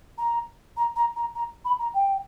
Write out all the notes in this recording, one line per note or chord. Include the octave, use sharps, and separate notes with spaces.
A#5
A#5
A#5
A#5
A#5
B5
A#5
G5